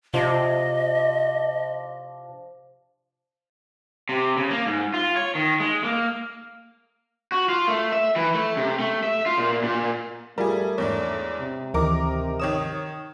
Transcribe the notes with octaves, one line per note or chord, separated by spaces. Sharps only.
C3 F3 D4 D#5
C3
C#3
A#3
G#2
F4
C#5
D#3
G#3
A#3
F#4
F4
A3
E5
E3
A3
C3
A3
E5
F4
A#2
A#2
G3 A3 F4 G#4 A#4
E2 G#2 D4 C#5
C3
D2 D#3 E3 D#4 A#4 D6
D#3 C#5 D#6 E7